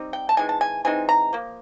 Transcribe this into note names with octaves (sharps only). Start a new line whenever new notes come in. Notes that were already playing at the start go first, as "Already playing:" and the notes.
Already playing: G3 C4 D#4
G5
A5
E3 G#3 C4 D#4 G#5
A5
G#5
E3 G#3 C4 D#4 G#5
A#5
F3 A#3